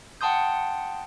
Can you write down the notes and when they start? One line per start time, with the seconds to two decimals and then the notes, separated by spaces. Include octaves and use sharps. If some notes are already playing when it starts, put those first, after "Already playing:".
0.21 F#5 G5 A5 C6 D#6 G6